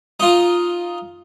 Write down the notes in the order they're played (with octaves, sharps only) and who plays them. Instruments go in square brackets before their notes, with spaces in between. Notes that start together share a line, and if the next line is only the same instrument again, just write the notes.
[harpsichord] D#4 F4